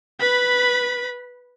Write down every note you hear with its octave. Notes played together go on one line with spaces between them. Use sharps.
B4 B5